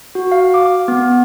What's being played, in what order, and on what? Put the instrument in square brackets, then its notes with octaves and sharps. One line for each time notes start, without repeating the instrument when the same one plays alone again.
[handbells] F#4
F5
D6
B3